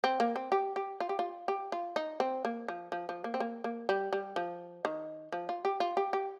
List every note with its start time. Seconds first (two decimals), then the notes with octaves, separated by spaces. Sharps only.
0.04 C4
0.20 A#3
0.36 C4
0.52 G4
0.76 G4
1.00 F4
1.09 G4
1.19 F4
1.48 G4
1.72 F4
1.96 D#4
2.20 C4
2.45 A#3
2.68 F3
2.92 F3
3.09 F3
3.24 A#3
3.34 C4
3.40 A#3
3.64 A#3
3.89 G3
4.13 G3
4.36 F3
4.85 D#3
5.32 F3
5.49 F4
5.65 G4
5.80 F4
5.97 G4
6.13 G4